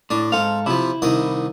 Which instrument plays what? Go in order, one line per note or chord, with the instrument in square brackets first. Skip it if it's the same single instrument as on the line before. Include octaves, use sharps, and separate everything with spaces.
[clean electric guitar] A2 [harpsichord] D4
[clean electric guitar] G#2 A4 F5 [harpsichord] C4
[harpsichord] C3 F3 [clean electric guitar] E4
[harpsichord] C2 D#3 D#6